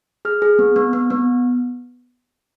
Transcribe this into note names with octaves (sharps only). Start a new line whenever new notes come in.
G#4 F6
G#4
B3
B3
B3
B3